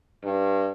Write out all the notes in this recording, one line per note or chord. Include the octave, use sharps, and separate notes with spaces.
G2